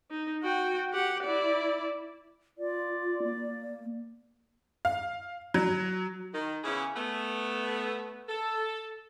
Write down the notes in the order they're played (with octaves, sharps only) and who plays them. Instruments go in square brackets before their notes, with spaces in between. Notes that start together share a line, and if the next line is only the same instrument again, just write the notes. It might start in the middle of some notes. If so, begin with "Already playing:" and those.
[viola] D#4
F#4 G5
G4 F#5
E4 D5
[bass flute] F4 [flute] D5
[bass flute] A#3
[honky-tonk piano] F5
F#3
[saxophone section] D#3
C#3 E3 B3 C#4 E4 G#4
A3 B3
A4